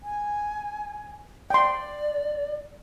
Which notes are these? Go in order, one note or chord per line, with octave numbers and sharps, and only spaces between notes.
G#5
D5 G5 C6